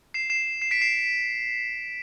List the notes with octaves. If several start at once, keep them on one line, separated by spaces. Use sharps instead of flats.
C7 E7
C7 E7
C7 E7
B6 D7
C7 E7